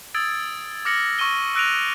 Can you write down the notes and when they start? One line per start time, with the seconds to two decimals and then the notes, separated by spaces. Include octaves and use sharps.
0.14 D#6 E6 G#6 A6 D7
0.85 D6 F6 A#6 C#7 F#7
1.19 C#6 E6 D#7 G7
1.55 E6 F#6 A#6 D7 D#7 F7